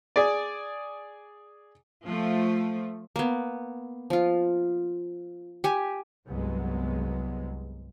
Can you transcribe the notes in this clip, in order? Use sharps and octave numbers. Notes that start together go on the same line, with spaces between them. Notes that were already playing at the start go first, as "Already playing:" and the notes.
G#4 D5
F3 A3
A#3 B3
F3 F4
G4 G#5
C2 G2 F#3 G#3 B3